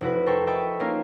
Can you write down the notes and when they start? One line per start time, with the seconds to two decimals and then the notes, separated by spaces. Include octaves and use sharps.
0.01 F1 E4 F#4 B4
0.26 A4 A#4 C5 E5 G5 C#6
0.47 D#5 E5 G5 A5 B5 C#6
0.80 A#3 C#4 D#4 F4 A#4